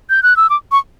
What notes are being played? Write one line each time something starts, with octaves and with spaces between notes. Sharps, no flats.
G6
F#6
E6
D6
C#6